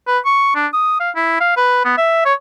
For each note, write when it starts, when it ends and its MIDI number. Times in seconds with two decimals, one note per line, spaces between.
0.08 0.19 71
0.26 0.53 85
0.55 0.67 62
0.73 0.99 87
1.00 1.11 77
1.16 1.38 64
1.40 1.54 77
1.57 1.84 71
1.85 1.97 59
1.97 2.20 76
2.25 2.34 73